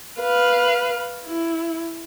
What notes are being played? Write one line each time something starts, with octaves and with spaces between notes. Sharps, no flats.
B4 F5
E4